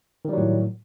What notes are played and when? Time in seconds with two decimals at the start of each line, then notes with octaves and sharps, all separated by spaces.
0.25 D#3
0.29 G3
0.33 F#3
0.37 A2